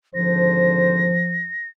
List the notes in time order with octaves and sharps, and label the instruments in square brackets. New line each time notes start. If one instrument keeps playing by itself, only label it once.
[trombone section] G#1 D3 C5 [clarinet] F3 [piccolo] A#6